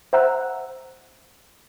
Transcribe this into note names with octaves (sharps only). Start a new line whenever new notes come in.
C5 E5 F#5 A#5 E6 F#6